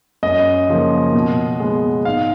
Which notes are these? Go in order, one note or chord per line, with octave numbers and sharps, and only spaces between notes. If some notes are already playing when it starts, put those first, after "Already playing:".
F#2 D#5
C#3 F3 A#3
B2
G#3 B3
G#2 F5